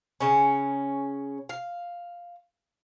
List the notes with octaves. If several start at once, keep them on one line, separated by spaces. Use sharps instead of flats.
C#3 C#4
F5